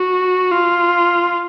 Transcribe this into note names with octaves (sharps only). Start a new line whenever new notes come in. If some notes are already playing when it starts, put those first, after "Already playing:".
Already playing: F#4
F4